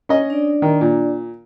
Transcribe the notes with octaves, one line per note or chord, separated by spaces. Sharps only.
C#4 D#5
D4 D5
D#3
A#2